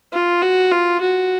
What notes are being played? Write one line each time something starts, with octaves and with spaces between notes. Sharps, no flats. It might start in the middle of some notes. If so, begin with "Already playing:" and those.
F4
F#4
F4
F#4